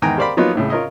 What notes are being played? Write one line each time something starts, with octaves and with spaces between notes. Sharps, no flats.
E2 G#2 D#3 G5 G#5 A#5
G4 A#4 C5 D5 F5 B5
F3 F#3 A#3 B3 D#4 F4
C#2 A2 C#3
F4 A#4 C#5 D#5